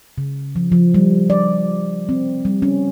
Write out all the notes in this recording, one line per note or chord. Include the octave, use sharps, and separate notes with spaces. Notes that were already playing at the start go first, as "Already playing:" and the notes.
C#3
F3
F3
G3
D5
C4
G3
C#4